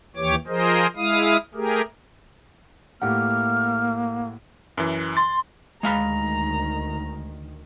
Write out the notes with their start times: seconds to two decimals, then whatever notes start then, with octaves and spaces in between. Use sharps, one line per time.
0.16 D#2 E3 G4 C#5 D6
0.47 F3 G#4 A#4 C5 D#5
0.96 G#3 E4 F5 D#6
1.54 A3 G4 G#4 A#4
3.02 A2 A#3 G4 F#5 F6
4.78 F#2 E3
5.17 C6 A6
5.83 D2 D#3 G#3 F5 A#5 B5